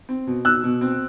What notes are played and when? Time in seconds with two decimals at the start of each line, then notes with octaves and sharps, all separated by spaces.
0.09 C4
0.27 B2
0.45 B2 E6 F#6
0.63 B2
0.81 C4